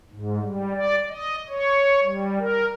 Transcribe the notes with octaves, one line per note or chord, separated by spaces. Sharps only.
G#2
G3
D5
D#5
C#5
G3
A#4